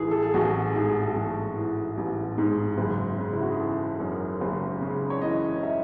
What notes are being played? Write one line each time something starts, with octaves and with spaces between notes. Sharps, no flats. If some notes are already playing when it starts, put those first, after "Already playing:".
Already playing: A1 E3 G#4 A4
A4
G#4
A1 F#4
G#2 G#4
A4
A1 G#4
E3
A1
G#2
F#1
C#3
E4
F#4
G#4
E3 A4
F#2
F#1
C#3
C#5
E3 D#5
E5